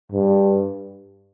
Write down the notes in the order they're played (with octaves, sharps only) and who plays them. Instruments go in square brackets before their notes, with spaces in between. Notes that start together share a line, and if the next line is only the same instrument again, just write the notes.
[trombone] G2